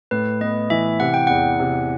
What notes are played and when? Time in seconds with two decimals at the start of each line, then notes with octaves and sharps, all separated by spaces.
0.11 A2 B4
0.41 B3 D#5
0.70 E3 E5
1.00 C3 F#5
1.14 G5
1.27 E2 F#5
1.59 C3